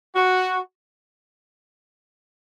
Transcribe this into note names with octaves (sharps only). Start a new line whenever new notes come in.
F#4